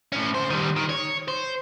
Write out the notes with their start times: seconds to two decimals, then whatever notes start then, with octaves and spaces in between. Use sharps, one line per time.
0.12 A2 C#4
0.35 D2 C5
0.50 D#3 G3
0.76 D#3
0.89 C#5
1.28 C5